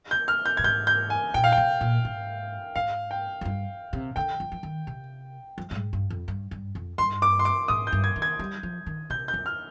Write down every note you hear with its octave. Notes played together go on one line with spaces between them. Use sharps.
G6
F6
G6
A#2 G#6
G#2 G6
G6
G#5
A#2 G5
F5
G5
C3
A#2
G#2
G#2 F5
G5
F2
G2
C3
D3 G5
F3
F3
D#3
C3
F3
G2
G#2
G2
F2
G2
G2
F2
G2 C6
D6
C6
D6
G#2 D#6
G6
G2
G#6
D#3
G#6
G3
F3
D#3
C3 G6
G6
F2
F6